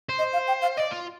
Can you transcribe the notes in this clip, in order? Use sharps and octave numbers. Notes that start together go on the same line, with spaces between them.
C5
D#5
F5
G5
F5
D5 D#5
F4